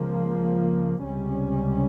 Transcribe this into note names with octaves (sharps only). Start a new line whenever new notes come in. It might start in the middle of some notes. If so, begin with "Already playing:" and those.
Already playing: C#2 C#3 F3 A#3
C#2 C3 G3 C#4